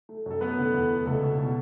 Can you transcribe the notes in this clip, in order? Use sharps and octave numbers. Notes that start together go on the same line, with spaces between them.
A3
F#2 A4
A3 B3 B4
D3
E2
A3
C#2 A3 A4
B2
B2